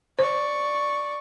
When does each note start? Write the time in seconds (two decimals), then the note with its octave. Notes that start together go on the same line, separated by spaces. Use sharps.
0.19 C5 D5 C#6